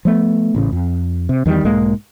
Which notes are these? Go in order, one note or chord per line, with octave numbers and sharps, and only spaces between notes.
F3 A3 B3
A1 A2 C#3
F2
C3
E2 D#3 F3 G3
B1 G#2 G#3 A#3